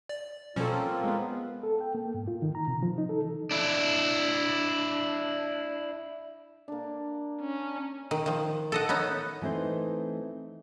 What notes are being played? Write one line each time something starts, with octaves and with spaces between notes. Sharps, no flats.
D5
B2 F3 G3 A#3 C4 C#4 F4 A4
G#3 B3
A4
G5
A#3
G#2
F4
D#3
A#5
C3
F3
D#4
A4
E3
D4 E4
A#3 D4
C#4
D#3
D#3 F3
A4 D#5 F#5
B3 C#4 D#4
E3 A3 C4 D#4 C5